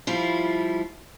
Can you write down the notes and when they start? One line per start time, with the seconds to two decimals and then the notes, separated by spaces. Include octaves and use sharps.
0.07 F3 G3 E4 F4